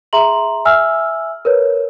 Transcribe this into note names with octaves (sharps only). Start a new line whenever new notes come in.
G#4 E5 A#5 C6 F#7
E5 G#5 E6 F6
A#4 B4 C#5